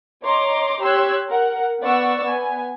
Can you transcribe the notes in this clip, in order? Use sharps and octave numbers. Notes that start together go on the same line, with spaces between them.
C#5 D#5 A#5 C6 D6
G4 C#5 C6 E6 F#6 G#6
A#4 F#5
B3 D5 F#5 C#6 E6
B3 G#5